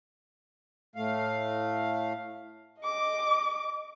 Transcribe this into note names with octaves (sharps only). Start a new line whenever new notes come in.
A2 A3 F5
D#5 D6